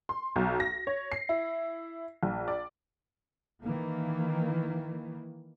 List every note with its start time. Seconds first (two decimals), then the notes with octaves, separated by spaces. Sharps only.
0.09 C6
0.36 B1
0.60 A#6
0.87 C#5
1.12 C7
1.29 E4
2.23 A#1
2.48 D5
3.65 D#3 E3 A#3